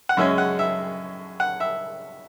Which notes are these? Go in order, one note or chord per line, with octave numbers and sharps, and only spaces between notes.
F#5
F#2 C#3 G#3 C#4 E5
F#5
E5
F#5
E5